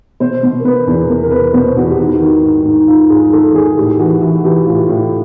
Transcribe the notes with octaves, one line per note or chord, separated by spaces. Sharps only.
B2 C5
B2
A#4
B2 B4
E2
B2 A#4
A#4
B2 B4
B2 C5
E2 F#4
G4
D#3 F#4
D#3
G#2
G#2
G#2 F4
G#2 G#4
D#3 A4
D#3 G#4
A2 G4
E3 F#4
E3 F#4
E3 G4
A2 F4
A2